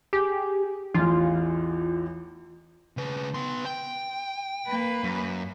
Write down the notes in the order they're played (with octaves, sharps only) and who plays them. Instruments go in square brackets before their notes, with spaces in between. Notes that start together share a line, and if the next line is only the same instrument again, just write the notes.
[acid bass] G4 [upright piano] G#4
[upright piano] A1 E2 E3 [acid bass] F4
[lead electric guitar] C#3 B4
B3 C6
G5
[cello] A#3 B4
[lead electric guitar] F#2